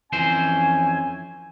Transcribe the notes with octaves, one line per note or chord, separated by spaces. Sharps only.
F2 E3 C#4 C5 G#5